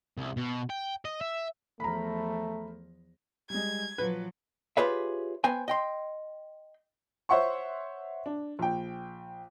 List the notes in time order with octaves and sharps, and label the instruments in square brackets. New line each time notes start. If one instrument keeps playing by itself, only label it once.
[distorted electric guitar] C2
B2
G5
D#5
E5
[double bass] E2 F3 [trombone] A3 [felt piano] A#5 B5
[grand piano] G3 G#3 [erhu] G#6
[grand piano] A#2 [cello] F3 F#3 [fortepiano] B4
[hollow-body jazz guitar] F4 G4 G#4 B4 C#5 E5
B3 C5 G5 G#5
D#5 G5 C6
[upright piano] C5 C#5 E5 F#5 C6 C#6
D4
A#1 G5